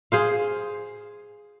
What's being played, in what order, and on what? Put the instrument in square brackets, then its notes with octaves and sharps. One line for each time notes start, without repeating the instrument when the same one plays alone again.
[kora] G#4 C5 F5